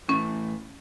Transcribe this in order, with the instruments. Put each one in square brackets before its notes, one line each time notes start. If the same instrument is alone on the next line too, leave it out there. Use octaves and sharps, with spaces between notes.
[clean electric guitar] A2 E3 A3 [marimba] C#4